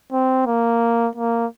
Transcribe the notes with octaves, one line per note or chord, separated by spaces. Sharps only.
C4
A#3
A#3